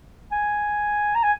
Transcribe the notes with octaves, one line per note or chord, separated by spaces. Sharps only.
G#5
A#5
G#5